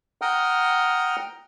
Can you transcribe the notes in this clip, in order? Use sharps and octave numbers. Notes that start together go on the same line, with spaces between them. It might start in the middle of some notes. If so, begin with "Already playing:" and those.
F#5 G5 A#5 D#6 F6